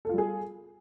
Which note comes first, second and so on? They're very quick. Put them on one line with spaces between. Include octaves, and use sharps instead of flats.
A4 F4 G3 G#4